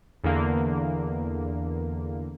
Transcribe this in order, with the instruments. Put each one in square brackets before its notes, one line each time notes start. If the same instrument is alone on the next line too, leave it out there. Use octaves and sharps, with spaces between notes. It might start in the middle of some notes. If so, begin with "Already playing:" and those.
[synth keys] E2 D3 A#3